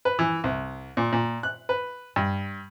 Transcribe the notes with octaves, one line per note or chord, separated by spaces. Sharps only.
B4
E3
C2
A#2
A#2
F#6
B4
G2